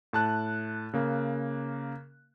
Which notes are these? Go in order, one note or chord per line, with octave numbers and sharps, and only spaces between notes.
A2 A5 F#6
C#3 A#3